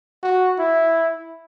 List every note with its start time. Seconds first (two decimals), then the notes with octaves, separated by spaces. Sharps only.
0.23 F#4
0.59 E4